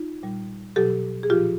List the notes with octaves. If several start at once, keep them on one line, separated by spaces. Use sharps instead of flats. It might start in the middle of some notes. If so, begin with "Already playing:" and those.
Already playing: D#4 F4
A#2 G3
B2 F#3 G4 A4
G#4
A#2 F3 F4 G4